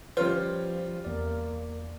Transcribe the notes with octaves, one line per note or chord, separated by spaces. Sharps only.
F3 G3 C#4 F4 B4 C#5
E2 A#3 D5